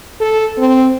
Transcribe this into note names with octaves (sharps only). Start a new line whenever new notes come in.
A4
C4